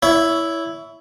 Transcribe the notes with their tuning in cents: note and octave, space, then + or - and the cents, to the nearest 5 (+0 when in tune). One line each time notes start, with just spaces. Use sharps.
E4 +0 C#5 +25